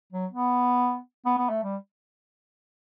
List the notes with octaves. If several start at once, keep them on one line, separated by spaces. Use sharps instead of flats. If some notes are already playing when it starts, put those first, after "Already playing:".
F#3
B3
B3
B3
A3
G3